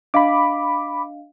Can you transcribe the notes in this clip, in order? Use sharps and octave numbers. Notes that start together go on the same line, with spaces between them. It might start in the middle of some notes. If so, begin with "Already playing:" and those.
D4 D#5 F5 B5 D6